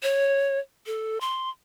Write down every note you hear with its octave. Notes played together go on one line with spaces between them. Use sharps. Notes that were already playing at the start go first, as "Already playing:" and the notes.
C#5
A4
C6